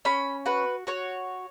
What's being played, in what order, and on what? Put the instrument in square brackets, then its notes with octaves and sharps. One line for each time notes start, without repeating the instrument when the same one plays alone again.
[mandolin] C#4 B5
F#4 B4
F#4 C#5